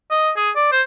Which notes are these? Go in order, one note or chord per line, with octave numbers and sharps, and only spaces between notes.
D#5
G#4
D5
C5